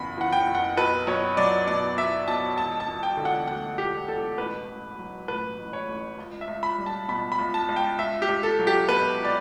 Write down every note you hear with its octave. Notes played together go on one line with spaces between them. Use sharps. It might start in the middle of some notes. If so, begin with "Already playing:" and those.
Already playing: F#1 E2 C#3 B5
E3 F#5
G5
F#1
F#5
B1 B4
B1 C#5
F#3 D5
B2 D5
B1 E5
B1 A5
E1 A5
A5
E1
G5
D3
F#5
D2 F#5
E1 G4
E1 A4
A1 B4
A1
F#3
A2 B4
A1
C#5
A1
C#2
E5
C#2
B5
G3
A5
B2 B5
B5
C#2
A5
C#2
G5
C#2 E5
G4
C#2
A4
F#3
G4
B2 B4
D5